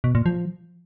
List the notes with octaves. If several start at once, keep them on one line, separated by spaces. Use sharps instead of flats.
B2
A#2
F3